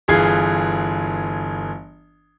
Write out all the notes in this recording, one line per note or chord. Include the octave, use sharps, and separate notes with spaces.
G1 E3 F4 G#4 G#6 C7